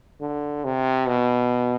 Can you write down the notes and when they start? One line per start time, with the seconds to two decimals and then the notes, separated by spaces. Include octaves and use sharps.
0.21 D3
0.65 C3
1.07 B2